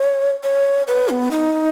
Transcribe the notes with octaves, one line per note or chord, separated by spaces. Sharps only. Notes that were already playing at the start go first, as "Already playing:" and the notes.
Already playing: C#5
C#5
B4
B3
D#4